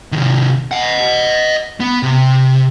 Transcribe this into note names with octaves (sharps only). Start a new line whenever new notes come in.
C3 D#3
D#5 F#5
B3
C3